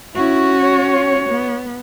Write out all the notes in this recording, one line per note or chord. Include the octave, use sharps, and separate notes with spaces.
C#4 E4 F#4
C#5
B3